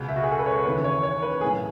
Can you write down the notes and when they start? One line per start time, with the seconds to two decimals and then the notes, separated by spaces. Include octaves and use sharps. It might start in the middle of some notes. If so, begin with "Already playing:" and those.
Already playing: C#2 B2
0.08 E5
0.16 F#4
0.23 G#4
0.31 A4
0.39 B4
0.46 C#5
0.65 D#2 C#3 E3 B4
0.84 C#5
1.03 C#5
1.22 B4
1.41 B1 A2 E3 G#4